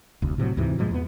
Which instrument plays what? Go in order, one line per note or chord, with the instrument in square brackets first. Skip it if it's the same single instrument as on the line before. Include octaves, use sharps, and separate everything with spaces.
[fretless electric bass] F1 D2
A2 C3 D#3 F#3
D2 G#2 C3 E3
G2 A#2 F3 G#3
E2 B3